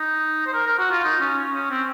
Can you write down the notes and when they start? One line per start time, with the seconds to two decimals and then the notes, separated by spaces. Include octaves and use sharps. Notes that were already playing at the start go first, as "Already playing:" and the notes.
Already playing: D#4
0.47 C5
0.54 A#4
0.67 A#4
0.79 F#4
0.91 F4
1.05 D#4
1.21 C#4
1.53 C#4
1.71 C4